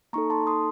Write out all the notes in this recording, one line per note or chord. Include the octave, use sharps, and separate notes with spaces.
A#3 D#4 A4 A#5 C#6
A5 C6
C6 D#6